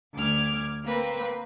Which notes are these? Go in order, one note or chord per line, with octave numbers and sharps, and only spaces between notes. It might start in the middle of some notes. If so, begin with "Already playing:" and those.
D2 D6 F6 G#6
A#3 C4 B4